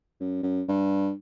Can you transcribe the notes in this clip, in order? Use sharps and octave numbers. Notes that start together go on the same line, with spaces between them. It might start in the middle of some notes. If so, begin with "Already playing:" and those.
F#2
F#2
G2